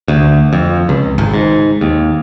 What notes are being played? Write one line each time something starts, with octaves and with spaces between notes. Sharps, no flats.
D2
F2
C#2
G#1
G#2
D#2